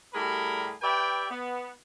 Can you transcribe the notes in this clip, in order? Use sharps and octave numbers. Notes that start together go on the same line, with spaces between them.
A2 G3 G4 G#4 A#4 B5
G4 B4 D5 E5 G5
B3